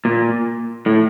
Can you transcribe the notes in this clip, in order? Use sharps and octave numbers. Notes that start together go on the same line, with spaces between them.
A#2
A2